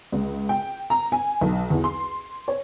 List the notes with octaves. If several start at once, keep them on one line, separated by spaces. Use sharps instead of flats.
C#2
G5
A#5
G#5
B1
E2
C6
C#5